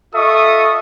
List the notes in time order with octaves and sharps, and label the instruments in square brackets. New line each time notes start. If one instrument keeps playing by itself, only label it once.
[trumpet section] F4 A4 D#5 E5 C#6 D#6